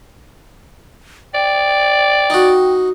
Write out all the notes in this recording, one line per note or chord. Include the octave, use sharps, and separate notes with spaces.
D5 G5
D#4 F#4